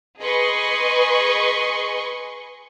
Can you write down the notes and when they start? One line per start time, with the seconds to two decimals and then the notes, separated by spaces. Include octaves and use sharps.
0.19 G#4 B4 D#5 C6 C#6